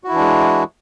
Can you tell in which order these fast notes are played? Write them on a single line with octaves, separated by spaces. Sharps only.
F#4 E4 E3 D4 G#3